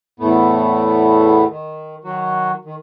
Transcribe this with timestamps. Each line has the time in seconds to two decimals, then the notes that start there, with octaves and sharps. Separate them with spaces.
0.20 E2 A2 A3 B3
1.50 D#3
2.04 D#3 F#3 F#4
2.65 D#3